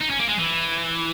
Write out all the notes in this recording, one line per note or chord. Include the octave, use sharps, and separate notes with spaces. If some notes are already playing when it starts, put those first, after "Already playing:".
D#4
C#4
A#3
G#3
E3